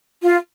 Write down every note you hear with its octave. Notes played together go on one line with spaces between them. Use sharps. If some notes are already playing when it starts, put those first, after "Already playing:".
F4